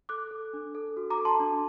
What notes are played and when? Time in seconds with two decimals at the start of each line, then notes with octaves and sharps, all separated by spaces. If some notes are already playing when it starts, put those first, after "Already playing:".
0.09 A4 D6 F#6
0.31 A4
0.53 D4
0.75 A4
0.97 F#4
1.10 A#5 D6
1.18 A4
1.25 A5 C6
1.40 D4